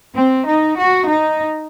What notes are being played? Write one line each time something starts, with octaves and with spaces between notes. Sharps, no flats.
C4
D#4
F#4
D#4